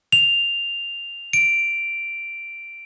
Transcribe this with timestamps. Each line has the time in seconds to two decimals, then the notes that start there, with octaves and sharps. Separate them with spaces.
0.12 F7
1.33 D7